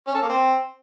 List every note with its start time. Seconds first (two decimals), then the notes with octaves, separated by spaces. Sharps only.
0.07 C#4
0.15 A4
0.22 A#3
0.29 C4